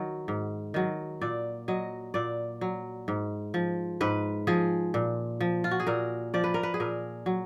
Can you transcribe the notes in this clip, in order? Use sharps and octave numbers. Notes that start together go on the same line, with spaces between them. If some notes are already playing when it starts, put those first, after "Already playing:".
Already playing: D#3 F#3
G#2
D#3 F#3
A#2 D5
F#3 D#5
A#2 D5
F#3
G#2
F3
G#2 B4
F3 G#4
A#2
F3
F4
F#4
G#4
A#2 A#4
F3 D5
B4
A#4
B4
G#4
A#2 A#4
F#3